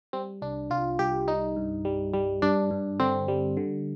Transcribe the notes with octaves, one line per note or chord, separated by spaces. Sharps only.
G3 C4
C2 D4
C2 F4
C2 G4
G3 D#4
G2
G3
G3
G2 D4
G2
D3 C4
G3
D3